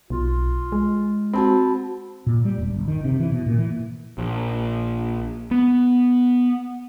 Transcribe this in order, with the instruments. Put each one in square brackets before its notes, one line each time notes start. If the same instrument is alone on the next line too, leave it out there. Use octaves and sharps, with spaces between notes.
[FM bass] B1 [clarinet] F4
[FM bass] G#3
[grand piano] C4 [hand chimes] F#4 A5 B5
[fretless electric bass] A#2
G3
E1
G1
D#3
C3
E3
B2
A#2
E3
[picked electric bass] A#1
B3